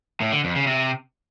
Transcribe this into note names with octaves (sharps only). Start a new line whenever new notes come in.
A2
D3
F2
C#3
C3